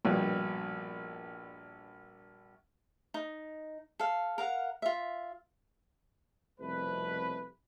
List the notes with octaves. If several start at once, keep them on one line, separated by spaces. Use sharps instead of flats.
A#1 G2 B2
D#4
A4 F5
A#4 F5 F#5
F4 E5
C2 F2 B2 A3 B4